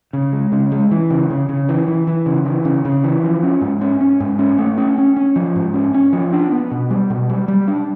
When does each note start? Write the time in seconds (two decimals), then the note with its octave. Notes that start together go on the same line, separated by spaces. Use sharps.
0.13 C#3
0.32 G#3
0.52 C#3
0.72 G#3
0.91 E3
1.10 C#3
1.30 C#3
1.49 C#3
1.69 E3
1.88 E3
2.07 E3
2.26 C#3
2.45 E3
2.65 C#3
2.85 C#3
3.04 E3
3.24 F3
3.43 C#4
3.61 G#2
3.81 C#4
4.01 C#4
4.20 G#2
4.39 C#4
4.58 A3
4.78 C#4
4.98 C#4
5.17 C#4
5.36 F3
5.56 G#2
5.74 C#4
5.94 C#4
6.13 F3
6.33 D4
6.52 B3
6.71 B2
6.90 G3
7.10 B2
7.29 G3
7.48 G3
7.68 D4